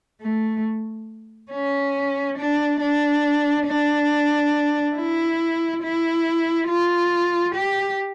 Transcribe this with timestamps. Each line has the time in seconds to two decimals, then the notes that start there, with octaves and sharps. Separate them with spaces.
0.22 A3
1.52 C#4
2.38 D4
2.80 D4
3.67 D4
4.96 E4
5.83 E4
6.68 F4
7.55 G4